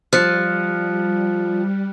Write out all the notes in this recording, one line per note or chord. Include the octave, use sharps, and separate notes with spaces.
F3 G3 F6 F#6 C#7